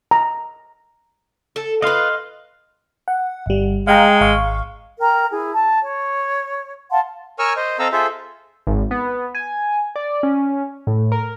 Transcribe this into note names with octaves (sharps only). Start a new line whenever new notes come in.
A#5
A4
F4 B4 D#5 F5 C6
F#5
G1 G3
G#3 F5 G5 A#5
G#1 F5 C#6
A#4 G5 A#5
E4 G#4
A5
C#5
F5 F#5 A5 C6
A#4 C#5 G#5 C#6 E6 F6
C5 D#5
C4 A4 D#5 F5 A#5 E6
F4 G#4 A4 C5 E5
G#1
B3
G#5
D5
C#4
A2
A#4